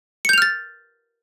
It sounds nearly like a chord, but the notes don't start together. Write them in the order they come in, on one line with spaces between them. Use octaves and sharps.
C#7 G6 F7 F6 A6